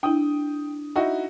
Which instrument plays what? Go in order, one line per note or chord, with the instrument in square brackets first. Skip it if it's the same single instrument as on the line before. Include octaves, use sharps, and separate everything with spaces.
[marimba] D4 E4 [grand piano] G5 D#6
[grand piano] D#4 E4 F#4